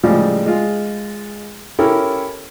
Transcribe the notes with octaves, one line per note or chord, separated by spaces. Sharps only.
A2 C#3 F3 G3 G#3
G#3 F4
C#4 E4 G4 A4 A#4